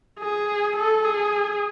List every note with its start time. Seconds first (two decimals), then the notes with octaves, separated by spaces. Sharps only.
0.19 G#4
0.76 A4
1.04 G#4